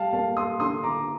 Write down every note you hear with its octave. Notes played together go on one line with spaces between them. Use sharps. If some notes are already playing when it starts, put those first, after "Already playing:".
Already playing: G3 F5 G5 A5
A#3 F5 A5
C6 D#6
D3 C6 D#6
A#5 D6